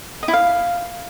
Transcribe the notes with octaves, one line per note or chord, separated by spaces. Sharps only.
D#5
E4
F5